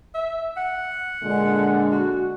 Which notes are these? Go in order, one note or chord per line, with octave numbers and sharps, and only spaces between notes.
E5
F#5
A#2 D3 G#3
F#4